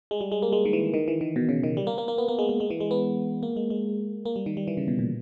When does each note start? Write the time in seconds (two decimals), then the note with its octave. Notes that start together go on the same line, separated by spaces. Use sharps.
0.11 G#3
0.21 G3
0.32 G#3
0.42 A#3
0.52 G#3
0.65 D#3
0.73 E3
0.94 D#3
1.08 E3
1.21 D#3
1.36 B2
1.49 C#3
1.63 D#3
1.77 G3
1.87 A#3
1.98 A#3
2.08 A#3
2.18 B3
2.28 A#3
2.39 G#3
2.49 G#3
2.60 G#3
2.70 E3
2.80 G#3
2.91 B3
3.43 A#3
3.56 G#3
3.70 G#3
4.26 A#3
4.36 G3
4.46 D#3
4.57 G3
4.68 E3
4.77 C#3
4.88 B2
4.99 A#2